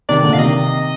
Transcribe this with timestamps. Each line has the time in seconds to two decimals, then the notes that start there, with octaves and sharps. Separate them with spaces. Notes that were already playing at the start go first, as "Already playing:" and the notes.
0.09 C3 D#3 D5
0.23 A#2 D3
0.33 F5
0.39 C3 D#3 D#5